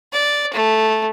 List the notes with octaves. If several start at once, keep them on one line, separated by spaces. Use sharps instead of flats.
D5
A3